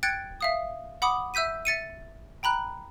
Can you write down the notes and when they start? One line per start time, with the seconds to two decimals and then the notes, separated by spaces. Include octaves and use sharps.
0.03 G5 F#6 G#6 A6 C#7 D7
0.41 E5 F5 D#6
1.02 F#5 B5 D6 D#6
1.34 E5 E6 G6 B6 D#7
1.65 E5 A6 C#7 D#7
2.43 G5 A#5 B5 F#6